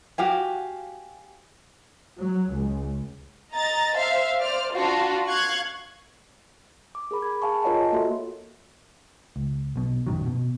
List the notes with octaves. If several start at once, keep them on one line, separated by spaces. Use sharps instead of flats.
F#4 G4 F5 G#5
F#3
C#2
D#5 A#5 A6
C5 E5 F5
C5 D5 F6
D4 F4 F#4
F5 C#6 F#6 G#6
D6
G#4 A#4 B5
A#4 B5 G#6
G#4 F5 G#5 A5 C#6
F4 A#4 C#5 D#5 F#5 A5
A#3 F4 F#4 A4 E5 C6
C#2
B1 B2
A#1 F#2 D#3 F#3
B2